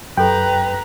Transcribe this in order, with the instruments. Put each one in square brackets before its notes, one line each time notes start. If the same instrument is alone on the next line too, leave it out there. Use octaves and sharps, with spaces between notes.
[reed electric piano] F#2 [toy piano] G4 A4 B5 [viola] B4 A#5 [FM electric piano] G5